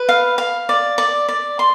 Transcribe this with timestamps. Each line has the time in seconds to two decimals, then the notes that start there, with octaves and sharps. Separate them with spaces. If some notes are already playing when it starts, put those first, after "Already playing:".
Already playing: B4
0.09 F5
0.38 F5
0.69 D5
0.98 D5
1.29 D5
1.59 C6